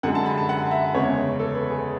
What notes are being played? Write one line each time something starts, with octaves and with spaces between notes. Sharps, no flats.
F#2 D3 G#3 F#5
A5
B5
A5
F#5
E5
E2 C#3 G#3 C#5
A4
B4
G#4